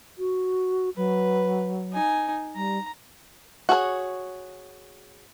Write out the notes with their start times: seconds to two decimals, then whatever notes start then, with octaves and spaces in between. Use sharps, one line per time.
0.18 F#4
0.97 F#3 B4
1.93 D#4 G#5
2.55 G3 A#5
3.69 F#4 G#4 A4 C#5